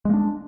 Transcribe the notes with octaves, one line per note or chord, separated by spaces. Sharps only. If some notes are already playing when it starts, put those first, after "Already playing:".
G#3 A#3 D4